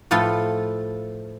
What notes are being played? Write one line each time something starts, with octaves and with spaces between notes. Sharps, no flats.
A2 F3 A3 F4 A4 B4